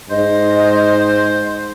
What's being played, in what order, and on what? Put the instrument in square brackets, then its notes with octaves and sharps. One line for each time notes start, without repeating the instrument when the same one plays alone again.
[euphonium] G#2 [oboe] C5 [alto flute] D#5